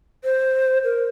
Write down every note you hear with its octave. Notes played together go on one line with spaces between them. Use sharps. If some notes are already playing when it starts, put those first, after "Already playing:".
C5
A#4